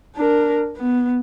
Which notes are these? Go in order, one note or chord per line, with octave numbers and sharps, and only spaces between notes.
D4 A#4
B3